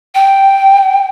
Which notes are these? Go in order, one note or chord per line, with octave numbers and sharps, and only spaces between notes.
G5